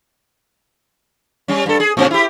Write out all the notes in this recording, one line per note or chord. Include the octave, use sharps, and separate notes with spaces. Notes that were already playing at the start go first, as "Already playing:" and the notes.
G3 C#4
G2 A4
G#4
A2 C4 C#4
E4 G4